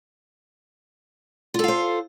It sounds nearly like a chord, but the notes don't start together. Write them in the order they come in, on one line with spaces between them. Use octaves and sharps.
F4 A4 F5 C5